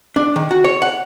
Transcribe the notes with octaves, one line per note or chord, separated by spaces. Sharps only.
D4
D#3
F#4
C#5
F#5